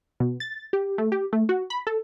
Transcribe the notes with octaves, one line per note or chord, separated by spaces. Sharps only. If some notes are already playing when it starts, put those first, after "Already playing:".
B2
A6
G4
A3
G4
A3
F#4
B5
A4